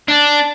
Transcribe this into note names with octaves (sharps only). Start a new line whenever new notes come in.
D4